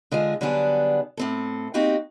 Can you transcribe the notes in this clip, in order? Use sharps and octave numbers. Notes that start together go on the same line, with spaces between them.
D3 G#3 F4 G#4
D3 F#3 G3 B3 D4 G#4
A2 C4 A4
A#3 C4 D#4 F#4 G4